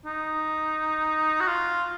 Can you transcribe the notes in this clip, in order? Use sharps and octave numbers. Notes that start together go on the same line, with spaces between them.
D#4
F#4
F4